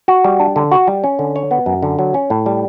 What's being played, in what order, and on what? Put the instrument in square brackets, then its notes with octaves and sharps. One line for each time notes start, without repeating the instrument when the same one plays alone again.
[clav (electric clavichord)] F#4
G3
D4
D3
F#4
G3
C#4
D3
C#5
B3
F#2
D3
F#3
C#4
A2
G3